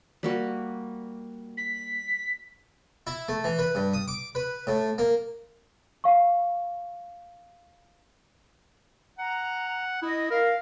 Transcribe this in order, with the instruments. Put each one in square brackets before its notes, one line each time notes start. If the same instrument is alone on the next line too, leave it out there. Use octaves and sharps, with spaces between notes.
[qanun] G3 A#3 F#4
[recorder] B6
[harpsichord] E4
A3
E3
B4
G2
D#6
D6
B4
A2
A#3
[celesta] F5 C#6
[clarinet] F#5 [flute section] A#5
[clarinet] E4 [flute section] D#5 D#6
[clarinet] A#4 [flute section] F5